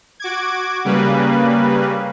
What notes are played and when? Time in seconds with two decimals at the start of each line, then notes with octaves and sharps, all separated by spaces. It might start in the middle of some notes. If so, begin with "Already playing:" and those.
0.20 F#4 D6 G#6
0.84 C#3 G3 A#3 B4